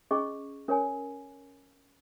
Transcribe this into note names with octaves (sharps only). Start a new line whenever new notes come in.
C#4 G#4 D#5 C#6
C#4 A#4 C#5 G#5